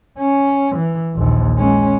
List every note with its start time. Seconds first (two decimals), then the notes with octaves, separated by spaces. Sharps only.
0.19 C#4
0.76 E3
1.15 A#1 D#2
1.57 G#3 C#4